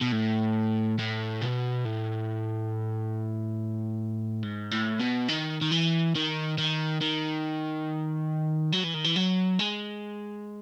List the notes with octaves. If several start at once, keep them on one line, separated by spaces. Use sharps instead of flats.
B2
A2
A2
B2
A2
G#2
A2
B2
D#3
D#3
E3
D#3
D#3
D#3
F#3
E3
D#3
E3
F#3
G#3